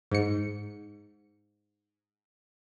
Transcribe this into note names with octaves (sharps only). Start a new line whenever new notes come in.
G#2 C#7